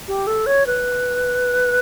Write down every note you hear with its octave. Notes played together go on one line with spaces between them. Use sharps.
G4
A4
C#5
B4